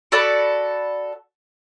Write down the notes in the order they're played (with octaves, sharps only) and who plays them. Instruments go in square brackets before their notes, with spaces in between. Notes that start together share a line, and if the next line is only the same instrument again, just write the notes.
[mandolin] F#4 A4 D5 B5